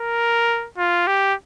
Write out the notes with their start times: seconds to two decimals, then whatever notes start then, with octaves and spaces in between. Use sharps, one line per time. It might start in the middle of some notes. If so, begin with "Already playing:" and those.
Already playing: A#4
0.78 F4
1.07 G4